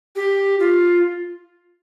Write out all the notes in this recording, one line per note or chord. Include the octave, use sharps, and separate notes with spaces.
G4
F4